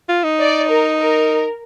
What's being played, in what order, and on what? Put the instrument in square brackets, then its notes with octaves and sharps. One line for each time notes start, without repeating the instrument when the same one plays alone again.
[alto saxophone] F4
D#4
[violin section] D5
A#4
A#4